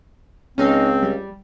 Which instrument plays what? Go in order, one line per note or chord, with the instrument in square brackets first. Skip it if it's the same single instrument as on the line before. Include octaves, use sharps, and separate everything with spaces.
[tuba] C#2 [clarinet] C4 [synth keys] C#4 D#4 F5
[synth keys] G3